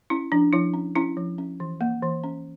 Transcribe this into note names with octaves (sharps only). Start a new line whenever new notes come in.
C#4 E4
F3 D4
F3 E4
C#4
C#4 E4
F3
C#4
E3
A#3
E3
C#4